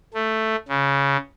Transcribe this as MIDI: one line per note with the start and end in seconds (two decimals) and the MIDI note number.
0.14 0.55 57
0.68 1.17 49